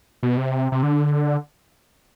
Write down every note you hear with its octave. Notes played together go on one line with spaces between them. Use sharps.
B2
C3
C3
D3